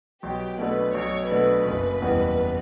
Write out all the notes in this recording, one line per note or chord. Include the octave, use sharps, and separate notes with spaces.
B1 G4
B2 A3 D4 A4 B4
B1 C#5
B2 A3 D4 A4 B4
F#1
E2 B2 G3